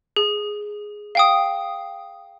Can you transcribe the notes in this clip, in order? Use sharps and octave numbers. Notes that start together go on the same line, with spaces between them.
G#4
F5 G5 D#6